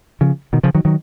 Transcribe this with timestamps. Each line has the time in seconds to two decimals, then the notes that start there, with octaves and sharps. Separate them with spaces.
0.21 C#3 F3
0.53 B2 D#3
0.63 C#3 F3
0.75 D#3 F#3
0.85 D#3 F#3